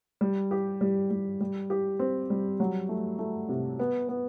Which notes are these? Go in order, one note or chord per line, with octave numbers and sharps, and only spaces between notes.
G3
G4
G3
G3
G3
G4
C4
G3
F#3
A3
A3
C3
B3
B3